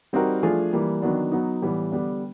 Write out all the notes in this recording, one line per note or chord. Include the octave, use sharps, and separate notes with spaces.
G3 C4 D#4 F#4 A#4
F3 A3 D4 F4 G#4
E3 G3 A#3
D#3 F#3 B3 D4
F#3 B3 D#4
A2 E3 G3 B3
D3 G3 B3 D4